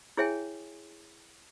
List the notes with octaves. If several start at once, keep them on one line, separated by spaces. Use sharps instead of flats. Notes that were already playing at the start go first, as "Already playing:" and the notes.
E4 G#4 C#5 E5 G5 G#5